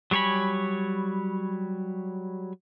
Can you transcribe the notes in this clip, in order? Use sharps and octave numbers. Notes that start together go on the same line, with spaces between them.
F#3 G3 C#5 G#5 B5